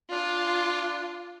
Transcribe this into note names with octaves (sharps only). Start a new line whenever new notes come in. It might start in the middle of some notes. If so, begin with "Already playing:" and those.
D4 F4